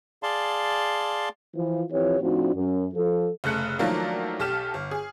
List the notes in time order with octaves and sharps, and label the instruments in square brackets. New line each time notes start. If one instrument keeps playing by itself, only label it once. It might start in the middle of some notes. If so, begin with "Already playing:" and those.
[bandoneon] G#4 D5 F5 A5 C6
[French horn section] E3 F3
E3 F3 C4 G4 C#5
A2 F3 C4 D4 D#4 F#4
F#2
F3 A4
[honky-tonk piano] F1 C#3 A3 F#6 C#7
D#3 F3 F#3 A3 A#3 D4
B1 G4 A4 F6 E7
G1
G#4